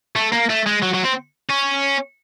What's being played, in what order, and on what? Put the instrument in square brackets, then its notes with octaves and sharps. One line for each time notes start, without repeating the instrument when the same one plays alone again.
[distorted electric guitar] A3
A#3
A3
G#3
F#3
F#3
C4
C#4